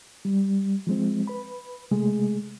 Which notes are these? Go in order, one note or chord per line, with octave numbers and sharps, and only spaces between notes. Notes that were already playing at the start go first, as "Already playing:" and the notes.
G3
F3 G#3 C4
B4 B5
C3 G#3 A3 G#4